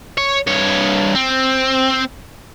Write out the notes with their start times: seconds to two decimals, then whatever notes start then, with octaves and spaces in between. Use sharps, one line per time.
0.17 C#5
0.47 G2 C#5
1.15 C4